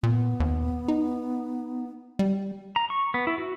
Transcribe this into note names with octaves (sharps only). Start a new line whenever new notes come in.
A#2 B3
D#2
D#4
G3
A#5
C#6
B3
E4
F#4